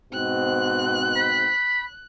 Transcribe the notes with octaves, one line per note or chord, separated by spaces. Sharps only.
G#2 B2 C4 F#6
B5